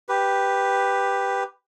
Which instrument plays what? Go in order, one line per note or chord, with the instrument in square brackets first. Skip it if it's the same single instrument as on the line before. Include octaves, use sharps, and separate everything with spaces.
[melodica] G4 B4